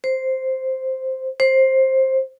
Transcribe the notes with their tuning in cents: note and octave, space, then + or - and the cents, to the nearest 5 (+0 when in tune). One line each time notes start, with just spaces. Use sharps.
C5 +0
C5 +15